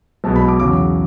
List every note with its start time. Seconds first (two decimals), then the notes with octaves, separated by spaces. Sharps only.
0.24 B1 B2 G#3 B3 A5
0.36 B5
0.48 D6
0.59 E2 C#3 F#3 D6